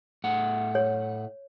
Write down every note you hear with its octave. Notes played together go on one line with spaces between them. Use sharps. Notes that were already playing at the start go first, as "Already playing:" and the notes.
A2 A3 F#5
C#5